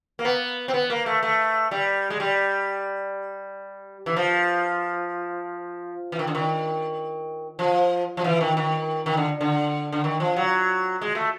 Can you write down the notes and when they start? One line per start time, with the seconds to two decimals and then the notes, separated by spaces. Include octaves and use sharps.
0.19 A#3
0.25 B3
0.68 C4
0.74 B3
0.90 A#3
1.06 A3
1.23 A3
1.71 G3
2.10 G#3
2.20 G3
4.06 E3
4.16 F3
6.12 E3
6.19 D#3
6.27 D3
6.35 D#3
7.59 F3
8.17 F3
8.24 E3
8.41 D#3
8.57 D#3
9.06 D#3
9.17 D3
9.41 D3
9.92 D3
10.04 D#3
10.20 F3
10.36 F#3
11.01 G#3
11.15 A3